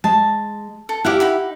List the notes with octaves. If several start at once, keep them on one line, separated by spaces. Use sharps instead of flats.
G#3 A5
A4
E4 G4 D5 F5 F#5
D#4 F#5 B5